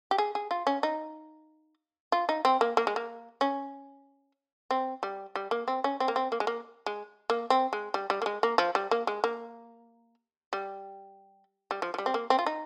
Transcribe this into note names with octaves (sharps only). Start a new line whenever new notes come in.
G4
G#4
G#4
F4
C#4
D#4
F4
D#4
C4
A#3
A#3
G#3
A#3
C#4
C4
G3
G3
A#3
C4
C#4
C4
A#3
C4
A#3
G#3
A#3
G#3
A#3
C4
G#3
G3
G3
A#3
G#3
A#3
F3
G3
A#3
G#3
A#3
G3
G3
F3
F3
G3
C4
A#3
C4
F4
D#4